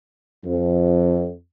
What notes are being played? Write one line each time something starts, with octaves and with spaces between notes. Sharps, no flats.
F2